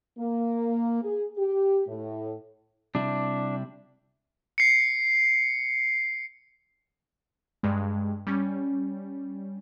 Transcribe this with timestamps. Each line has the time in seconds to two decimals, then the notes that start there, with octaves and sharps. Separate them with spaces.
0.19 A#3
1.03 G#4
1.38 G4
1.88 A2
2.95 C3 G3 D4 E4
4.58 C7 C#7
7.63 G2 G#3
8.27 G3 C#4